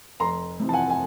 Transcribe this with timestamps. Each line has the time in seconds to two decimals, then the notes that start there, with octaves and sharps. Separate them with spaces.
0.20 F1 A#5 C6
0.60 F2 C3 E3
0.69 A5
0.73 F#5 G#5
0.90 G#5